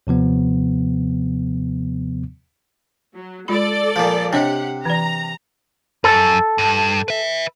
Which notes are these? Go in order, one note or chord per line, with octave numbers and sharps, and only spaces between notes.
D#2 C3 F3 B3
F#3
G#3 F4 A4 D5 B5
A#2 F3
C3 D4 G4 C#5 D#5 F#5
E3 D5 A#5
F#2 A4
G2
B4 E5